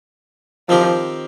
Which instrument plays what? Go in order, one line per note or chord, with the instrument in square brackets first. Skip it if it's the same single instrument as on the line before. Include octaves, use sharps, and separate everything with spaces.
[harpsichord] D#3 C4 G4 A#4 [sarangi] F3